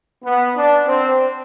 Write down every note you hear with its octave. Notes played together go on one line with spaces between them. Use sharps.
B3
D4
C4